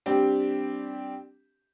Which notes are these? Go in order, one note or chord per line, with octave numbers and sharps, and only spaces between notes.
G3 C4 D4 G4